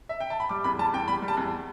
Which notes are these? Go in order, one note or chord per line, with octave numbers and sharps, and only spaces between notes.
E5
G5
A5
B5
G3 D6
E2 B5
G3 A5
E2 G5
G3 B5
G3
A5
E2